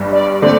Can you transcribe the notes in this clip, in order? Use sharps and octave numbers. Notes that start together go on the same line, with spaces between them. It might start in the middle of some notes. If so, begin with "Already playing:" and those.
Already playing: G1 G2 G3
D5
D3 A3 C4 D5